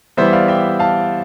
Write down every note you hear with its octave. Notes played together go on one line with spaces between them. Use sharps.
E3 G3 B3 C5 E5
D5 F5
E5 G5
F5 A5